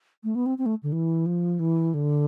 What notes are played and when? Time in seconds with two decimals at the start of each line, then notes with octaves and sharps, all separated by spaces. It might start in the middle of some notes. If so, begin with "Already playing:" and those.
0.24 A3
0.35 B3
0.46 C4
0.58 C4
0.66 A3
0.83 D3
0.92 E3
1.26 F3
1.59 E3
1.94 D3